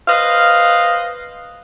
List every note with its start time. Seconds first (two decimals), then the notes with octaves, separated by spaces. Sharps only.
0.08 B4 C5 D#5 F5